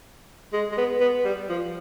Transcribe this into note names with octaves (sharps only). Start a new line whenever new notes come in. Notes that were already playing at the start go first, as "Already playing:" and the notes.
G#3
G#3
B3
B3
G3
F3